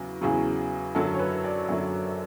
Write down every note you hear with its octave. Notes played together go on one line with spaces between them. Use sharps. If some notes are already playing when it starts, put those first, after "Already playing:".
Already playing: E2 C#3 F#3
E2 C#3 F#3 G#4
F#2 D3 F#3 A4
C#5
B4
D5
F#2 D3 F#3 E5